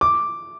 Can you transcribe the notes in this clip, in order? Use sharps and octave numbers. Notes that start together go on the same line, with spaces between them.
D6